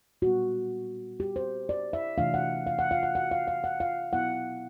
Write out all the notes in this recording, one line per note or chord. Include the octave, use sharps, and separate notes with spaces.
A#2 G3 B3 F#4
G4
C5
D5
E5
C3 E3 A3 D4 F5
F#5
F5
F#5
F5
F#5
F#5
F5
F5
F#5
F5
B2 F#3 B3 E4 F#5